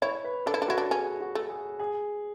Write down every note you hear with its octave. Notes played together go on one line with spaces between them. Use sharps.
E4 C#5
B4
D4 A4
E4
D4
E4 F#4
D4
C#4 G#4
F#4
A3
G#4
G#4